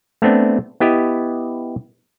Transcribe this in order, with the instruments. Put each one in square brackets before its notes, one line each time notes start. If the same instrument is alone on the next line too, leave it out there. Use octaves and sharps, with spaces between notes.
[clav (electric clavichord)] A3 B3 C4 D4
B3 E4 G4 D#5